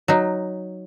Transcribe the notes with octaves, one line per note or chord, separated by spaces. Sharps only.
F#3 D#4